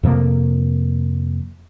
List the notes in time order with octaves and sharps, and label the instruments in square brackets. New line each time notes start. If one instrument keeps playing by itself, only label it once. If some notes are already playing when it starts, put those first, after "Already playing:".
[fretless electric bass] F2 C3 F3 A#3